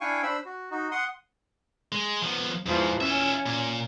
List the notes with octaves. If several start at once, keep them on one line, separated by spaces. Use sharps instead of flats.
D4 E4 F5 G5 G#5 C#6
D4 C5 B5 E6
F#4
D#4 F#4
F#5 C6 D#6
G#3
F3 B3
E2 G#2 E3 F3
C#4 F4 E5
A#2